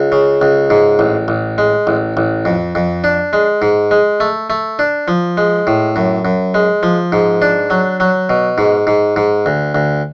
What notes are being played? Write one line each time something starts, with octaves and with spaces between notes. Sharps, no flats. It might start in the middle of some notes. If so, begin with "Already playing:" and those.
Already playing: C#2
C#3
C#2
G#2
A1
A1
G#3
A1
A1
F2
F2
D4
G#3
G#2
G#3
A3
A3
D4
F3
G#3
A2
F#2
F#2
G#3
F3
G#2
D4
F#3
F#3
B2
G#2
G#2
G#2
D2
D2